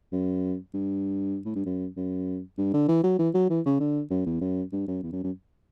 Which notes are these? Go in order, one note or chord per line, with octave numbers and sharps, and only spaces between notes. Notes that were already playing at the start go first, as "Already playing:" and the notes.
F#2
G2
A2
G2
F#2
F#2
G2
D3
E3
F#3
E3
F#3
E3
C#3
D3
F#2
E2
F#2
G2
F#2
E2
F#2
F#2